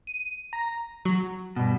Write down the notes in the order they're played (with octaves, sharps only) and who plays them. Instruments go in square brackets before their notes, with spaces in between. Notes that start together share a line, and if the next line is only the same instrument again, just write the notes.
[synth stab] D#7
A#5
F#3
[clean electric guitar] G2 B2